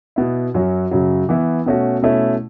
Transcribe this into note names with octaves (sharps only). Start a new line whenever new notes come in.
B2 B3 E4
F#2 F#3 C#4 F#4
F#2 C#3 F#3
E3 B3 E4
B2 A3 C#4 F#4
B2 A3 C#4 E4